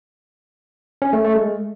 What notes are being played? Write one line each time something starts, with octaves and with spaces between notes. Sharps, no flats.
C#4
A3
A3
G#3